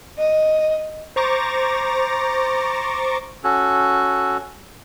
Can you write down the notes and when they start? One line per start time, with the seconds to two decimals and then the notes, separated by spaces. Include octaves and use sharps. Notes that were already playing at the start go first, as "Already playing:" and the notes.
0.18 D#5
1.16 C5 A#5 C#6 D6 A6 A#6
3.44 C#4 F#4 A4